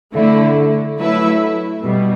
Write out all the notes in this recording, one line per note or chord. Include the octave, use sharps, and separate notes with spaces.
D3 A3 E4
F#3 A3 E4 B4 E5
B2 G3